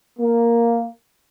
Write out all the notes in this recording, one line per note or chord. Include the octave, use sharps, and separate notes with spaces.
A#3